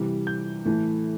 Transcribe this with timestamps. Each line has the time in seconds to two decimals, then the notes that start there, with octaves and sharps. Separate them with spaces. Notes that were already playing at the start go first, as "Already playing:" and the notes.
Already playing: C3 E3 G3
0.27 G6
0.65 A2 E3 A3